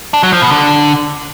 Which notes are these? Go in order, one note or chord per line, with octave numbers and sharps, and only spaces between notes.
D4
F#3
F3
B2
D3